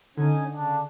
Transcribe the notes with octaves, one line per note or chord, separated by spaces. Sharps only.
D3 C#4 D#4 G#5
C#3 D4